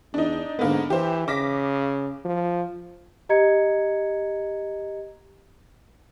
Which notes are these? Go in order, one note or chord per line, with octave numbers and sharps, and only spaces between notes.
E2 D4 D#4
G#2 D3 A#3 B3
E3 G4 C5
C#3 D6 A#6 B6
F3
G4 D#5 A#5 G#6 C#7